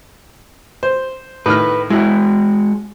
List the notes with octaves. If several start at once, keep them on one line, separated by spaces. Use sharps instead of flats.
C5
A2 D#3 B4 F6
G#3 E4 F#4